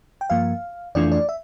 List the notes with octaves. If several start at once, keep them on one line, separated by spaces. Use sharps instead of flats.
G5
G2 F3 A#3 F5
F2 E3 A3 D4 F4 D5
D5
E5